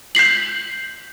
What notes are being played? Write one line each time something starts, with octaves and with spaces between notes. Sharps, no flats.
G6 B6 C7 F#7